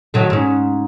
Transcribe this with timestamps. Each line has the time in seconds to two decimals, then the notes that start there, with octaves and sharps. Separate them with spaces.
0.14 D#3 F#3 A3
0.30 G#2 C#4